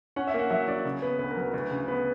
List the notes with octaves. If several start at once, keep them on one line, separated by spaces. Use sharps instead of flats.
C#4 F#5
E5
A#3
F#5
F#3 E5
C#4 D5
C#3
B3 B4
D2 B4
A#4
F#3
B4
D2 B4
C#3
B3 B4